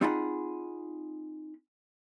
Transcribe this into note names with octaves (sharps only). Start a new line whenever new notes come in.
C4 D#4 F4 G#4 F#5 B5